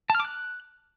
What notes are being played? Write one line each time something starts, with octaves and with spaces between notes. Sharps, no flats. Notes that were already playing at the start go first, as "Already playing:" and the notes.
A5
F6
D6
F#6